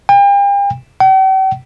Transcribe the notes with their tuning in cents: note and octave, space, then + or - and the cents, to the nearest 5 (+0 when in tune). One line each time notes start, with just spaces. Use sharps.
G5 +40
G5 -45